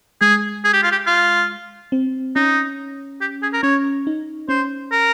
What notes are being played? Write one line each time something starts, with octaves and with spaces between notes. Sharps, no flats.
G#3 G#4
G#4
G4
F4
G4
F4
C4
C#4 D#4
G4
G#4
A#4
C#4 C#5
D#4
C#4 C5
A#4